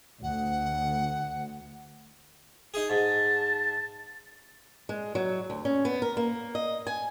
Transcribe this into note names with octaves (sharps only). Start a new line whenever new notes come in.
D2 F#5
D#4 G#4
G#2 A5
G#3
F#3
D2
C#4
B3
A#4
A#3
D#5
G#5